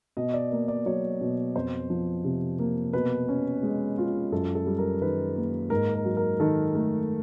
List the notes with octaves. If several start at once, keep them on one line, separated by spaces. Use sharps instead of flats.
B2 D#5
D5
A#3
D5
F#3 C#5
B2
F2 C5
F3
C3
A#3
B2 B4
C#4
G#3
F4
F#2 A4
A4
G3
A#4
D#3 B4
A#3
G#2 A#4
A#4
F#3
A#4
D#3 A4
A3